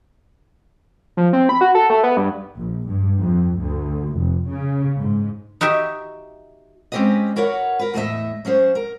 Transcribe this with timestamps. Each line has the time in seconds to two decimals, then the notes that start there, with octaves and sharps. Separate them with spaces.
1.17 F3
1.33 C4
1.49 B5
1.61 F#4
1.75 A4
1.90 A3
2.03 B3
2.17 G2
2.54 A#1
2.87 G2
3.20 F2
3.58 D2
4.16 F1
4.47 C#3
4.97 G#2
5.61 D#4 F#4 G4 E5
6.92 G#3 C4 C#4 G4 B4 D#5
7.36 F#4 A#4 B4 C#5 D#5 F#5
7.79 A#4 B4
7.94 E2 A2 A3 A#4 D#5 E5
8.45 F#3 C#4 G#4 C5
8.75 A#4